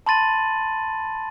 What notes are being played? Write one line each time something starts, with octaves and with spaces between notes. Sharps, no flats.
A5 B5 C6 A6 D#7 F#7